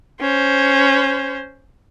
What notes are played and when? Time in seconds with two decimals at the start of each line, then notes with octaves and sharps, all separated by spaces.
0.21 C#4 C5